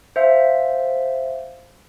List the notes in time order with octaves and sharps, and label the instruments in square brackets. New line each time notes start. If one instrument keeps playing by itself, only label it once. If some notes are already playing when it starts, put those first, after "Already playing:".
[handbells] C5 E5 F5